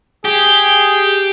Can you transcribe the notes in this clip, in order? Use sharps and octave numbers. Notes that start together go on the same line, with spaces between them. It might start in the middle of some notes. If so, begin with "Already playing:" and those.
G4 G#4